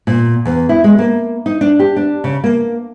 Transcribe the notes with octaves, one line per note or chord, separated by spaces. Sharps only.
A#2
E2
E4
G#3
A#3
D#4
D4
G4
D4
C#3
A#3